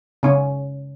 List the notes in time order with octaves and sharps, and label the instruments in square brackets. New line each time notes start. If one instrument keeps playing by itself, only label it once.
[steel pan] C#3 C#4